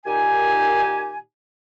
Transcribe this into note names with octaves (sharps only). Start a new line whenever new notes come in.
A#2 D#3 D#4 G4 G#5